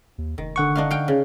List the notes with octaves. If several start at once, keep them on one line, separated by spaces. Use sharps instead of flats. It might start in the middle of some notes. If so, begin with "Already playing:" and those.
D#2
F1 D#3
D3 F#5 C#6
D4 D#4 F5
F5 G5
C#3